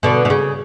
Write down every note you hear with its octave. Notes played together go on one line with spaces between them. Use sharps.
B2 D3
B2
C#3